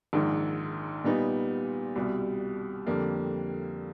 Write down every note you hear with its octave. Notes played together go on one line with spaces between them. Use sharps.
A#1 G#2 D#3
A#2 G3 B3 D#4
C2 B2 G3
F2 D3 G3 A#3